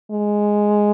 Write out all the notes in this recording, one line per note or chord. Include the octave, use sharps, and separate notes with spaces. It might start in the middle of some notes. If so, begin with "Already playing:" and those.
G#3